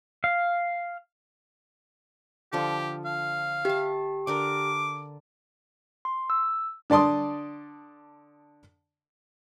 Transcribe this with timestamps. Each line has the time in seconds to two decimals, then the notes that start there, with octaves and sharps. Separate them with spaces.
0.24 F5
2.53 D3 F3 G4 A4
3.05 F5
3.65 G4 E5 A5
4.27 D3 D4 A#4 D6
6.05 C6
6.30 E6
6.90 D3 D5 A5 C6 D#6